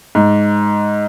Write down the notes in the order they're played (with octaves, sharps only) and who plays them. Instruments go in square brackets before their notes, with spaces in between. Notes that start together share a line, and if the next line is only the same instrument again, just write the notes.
[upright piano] G#2